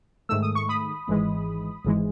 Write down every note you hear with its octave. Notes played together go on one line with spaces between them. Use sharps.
G#2 D#3 A3 E6
D#6
C#6
B5 D#6
G#1 G#2 E3 G#3
G#1 G#2 E3 G#3